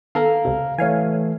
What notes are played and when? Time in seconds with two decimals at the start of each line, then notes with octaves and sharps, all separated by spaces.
0.15 D#3 B3 A4 F5 A#5 F6
0.45 C#2 C3
0.78 E3 A3 C#5 F5 G#5